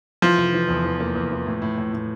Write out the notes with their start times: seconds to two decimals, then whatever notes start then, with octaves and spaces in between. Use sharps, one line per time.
0.22 E3 F3
0.38 F1
0.54 E3
0.69 E2
0.84 E3
1.00 A#3
1.15 E2
1.31 E3
1.47 A2
1.62 A2
1.78 A2
1.93 A2